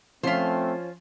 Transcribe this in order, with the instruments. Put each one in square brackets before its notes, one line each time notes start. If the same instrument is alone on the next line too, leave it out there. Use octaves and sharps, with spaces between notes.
[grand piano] F3 C#4 B6 [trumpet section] A3 C4 [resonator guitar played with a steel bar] F4 C5